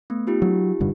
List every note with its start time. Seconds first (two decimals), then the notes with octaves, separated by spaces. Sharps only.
0.10 A3 B3
0.27 D#4 F4 G4
0.42 F#3
0.80 F1 G2 D3